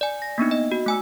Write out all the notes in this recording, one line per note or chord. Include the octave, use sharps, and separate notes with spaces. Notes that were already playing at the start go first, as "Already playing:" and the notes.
D5 G#5
A#6
A#3 B3 D4 D#4
D#5
F#4
A3 G#5 E6